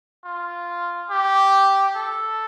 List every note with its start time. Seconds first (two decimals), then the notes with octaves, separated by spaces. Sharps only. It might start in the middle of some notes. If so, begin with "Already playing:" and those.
0.25 F4
1.10 G4
1.96 A4